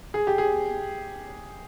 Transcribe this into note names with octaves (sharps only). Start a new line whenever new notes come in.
G#4
G4
G#4